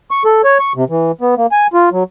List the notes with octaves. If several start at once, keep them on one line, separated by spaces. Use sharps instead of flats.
C#6
A4
C#5
C#6
C3
E3
B3
A#3
G#5
F4
F#3